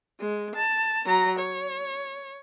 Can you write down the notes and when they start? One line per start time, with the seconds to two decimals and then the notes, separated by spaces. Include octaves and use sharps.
0.20 G#3
0.55 A5
1.05 F#3 A#5
1.38 C#5